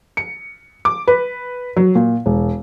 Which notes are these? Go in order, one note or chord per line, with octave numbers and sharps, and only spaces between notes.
C#7
D6
B4
F#3
A#2
E1